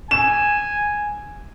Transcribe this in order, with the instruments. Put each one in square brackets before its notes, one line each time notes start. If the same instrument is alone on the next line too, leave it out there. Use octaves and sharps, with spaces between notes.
[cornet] G#5 [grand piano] E7